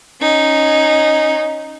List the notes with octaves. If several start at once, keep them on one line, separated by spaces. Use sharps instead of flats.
C#4 D#4